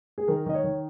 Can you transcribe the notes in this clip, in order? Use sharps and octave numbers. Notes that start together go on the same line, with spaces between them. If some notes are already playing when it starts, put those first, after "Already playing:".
G#4
D#3 A#4
D#3 D#5
C#5
D#3